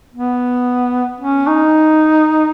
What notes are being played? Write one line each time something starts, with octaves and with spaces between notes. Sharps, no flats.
B3
C#4
D#4